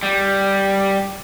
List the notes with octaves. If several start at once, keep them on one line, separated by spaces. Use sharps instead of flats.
G3